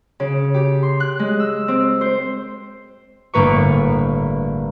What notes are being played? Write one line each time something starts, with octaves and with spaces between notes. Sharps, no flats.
C#3
G4
C6
F#6
G#3
E6
C4
C5
G1 A2 A#3 B4 C#6